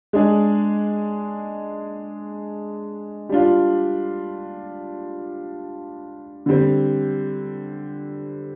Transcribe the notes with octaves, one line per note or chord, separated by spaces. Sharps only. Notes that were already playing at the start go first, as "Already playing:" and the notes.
G#3 D4 G#4
G3 D4 F4
D3 G3 C4